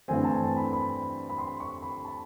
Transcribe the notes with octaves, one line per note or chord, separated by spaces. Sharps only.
G2 E3 A3 C4 G#5
A5
B5
B5
B5
C6
C#6
B5
A5